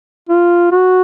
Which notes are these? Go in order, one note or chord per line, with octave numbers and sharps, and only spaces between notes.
F4
F#4